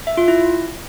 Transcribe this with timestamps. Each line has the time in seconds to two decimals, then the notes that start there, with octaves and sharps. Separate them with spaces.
0.07 E5
0.17 F4
0.28 E4